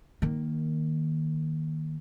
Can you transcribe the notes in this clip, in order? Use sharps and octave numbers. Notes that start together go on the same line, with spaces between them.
D#3 A#3